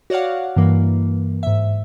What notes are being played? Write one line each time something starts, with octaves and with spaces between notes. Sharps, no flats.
F#4 C#5 D5 F5 F#5
G2 E3 A#3
G#2 E5